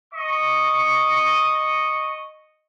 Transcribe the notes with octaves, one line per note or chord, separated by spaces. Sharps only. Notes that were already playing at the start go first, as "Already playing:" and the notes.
D#5 C#6